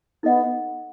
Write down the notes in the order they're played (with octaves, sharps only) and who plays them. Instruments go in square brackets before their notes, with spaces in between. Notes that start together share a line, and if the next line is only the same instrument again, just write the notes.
[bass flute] B3 [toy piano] D#4 A4 D#5 F#5